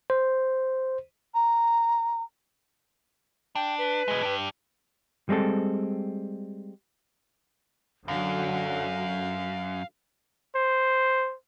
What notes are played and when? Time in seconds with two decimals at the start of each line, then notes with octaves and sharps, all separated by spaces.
0.10 C5
1.34 A#5
3.55 D4 G5
3.78 B4
4.08 B2 G#3
4.23 D4 G4
5.29 G3 G#3 C4 A4
8.08 F#2 D3 F#3 F5
10.55 C5